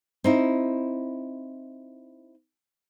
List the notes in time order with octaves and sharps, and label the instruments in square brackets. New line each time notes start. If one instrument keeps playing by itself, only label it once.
[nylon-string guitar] C4 D#4 E4